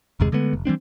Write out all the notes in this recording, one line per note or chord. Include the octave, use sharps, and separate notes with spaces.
G1 E2 C3 G#3
D3 G#3 A3 B3
F1
E3 G3 C4 D4